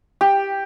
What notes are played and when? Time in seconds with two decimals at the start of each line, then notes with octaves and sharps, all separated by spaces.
0.21 G4